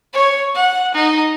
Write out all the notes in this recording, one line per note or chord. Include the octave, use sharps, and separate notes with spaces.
C#5
F#5
D#4